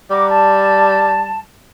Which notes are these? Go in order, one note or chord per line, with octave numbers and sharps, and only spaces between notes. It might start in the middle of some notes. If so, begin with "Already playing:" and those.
G3 F#5 A#5 D6
A5